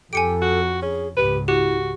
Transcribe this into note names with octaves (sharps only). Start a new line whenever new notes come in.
F2 G4 A4 G#5 C#7 D7
F#4
C#4 G#4
C#2 G#2 G4 B4
E4 F#4 G4